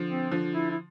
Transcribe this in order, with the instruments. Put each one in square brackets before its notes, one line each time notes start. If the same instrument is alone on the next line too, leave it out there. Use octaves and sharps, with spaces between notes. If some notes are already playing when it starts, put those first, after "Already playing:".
Already playing: [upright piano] D3 F3
[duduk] C4
[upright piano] D3 F3
[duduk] E4
E4